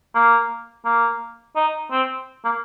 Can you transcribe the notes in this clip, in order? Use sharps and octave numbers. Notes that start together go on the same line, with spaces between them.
A#3
A#3
D#4
C4
A#3